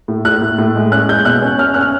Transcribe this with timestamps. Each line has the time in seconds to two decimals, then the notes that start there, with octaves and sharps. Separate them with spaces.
0.08 A2
0.25 A2 F#6
0.42 A2
0.58 A2
0.75 G#3
0.91 C#4 F#6
1.09 G#3 G6
1.25 B2 F#6
1.42 C#4
1.58 C#4 F6
1.74 C#4 F#6
1.81 F6